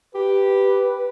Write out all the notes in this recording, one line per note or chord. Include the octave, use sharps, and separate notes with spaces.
G4 B4